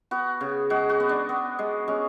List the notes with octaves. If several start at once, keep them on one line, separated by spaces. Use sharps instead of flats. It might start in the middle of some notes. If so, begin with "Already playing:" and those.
B3 F#4
C#3
G#3 F#4
F#4
B3
D4
B3
G#3
G#3 C#4